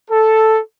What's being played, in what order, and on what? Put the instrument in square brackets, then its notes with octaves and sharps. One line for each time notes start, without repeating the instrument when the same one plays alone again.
[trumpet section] A4